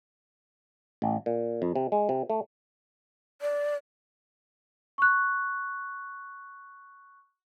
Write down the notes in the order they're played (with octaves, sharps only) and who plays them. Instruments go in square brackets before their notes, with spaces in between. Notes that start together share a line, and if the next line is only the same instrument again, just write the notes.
[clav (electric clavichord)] A1
A#2
F2
C3
G#3
C3
A3
[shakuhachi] D5
[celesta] C#6 F#6